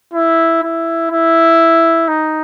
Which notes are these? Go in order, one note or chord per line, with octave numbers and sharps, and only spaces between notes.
E4
E4
E4
D#4